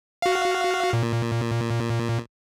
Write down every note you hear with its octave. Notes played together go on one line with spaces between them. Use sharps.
F#4 F5
A#2